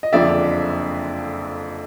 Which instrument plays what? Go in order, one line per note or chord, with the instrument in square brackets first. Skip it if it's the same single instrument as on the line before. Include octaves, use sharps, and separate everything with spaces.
[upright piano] D#5
F#1 F2 D3 F3 D5 E5